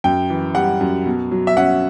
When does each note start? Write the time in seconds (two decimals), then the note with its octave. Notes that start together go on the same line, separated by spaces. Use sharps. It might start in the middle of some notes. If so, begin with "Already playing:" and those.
0.04 F#2 G5
0.30 E3
0.54 G3 F#5
0.81 F#2
1.06 B2
1.31 F#3
1.47 E5
1.57 C#4 F#5